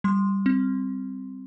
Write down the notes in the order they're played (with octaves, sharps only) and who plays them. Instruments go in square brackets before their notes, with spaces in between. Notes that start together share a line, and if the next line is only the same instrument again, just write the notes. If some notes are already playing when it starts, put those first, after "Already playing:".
[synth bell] G3 C6
C4